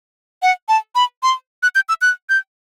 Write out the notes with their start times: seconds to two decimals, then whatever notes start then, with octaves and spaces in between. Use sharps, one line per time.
0.43 F#5
0.69 A5
0.95 B5
1.23 C6
1.63 F#6
1.75 G6
1.89 E6
2.02 F#6
2.29 G6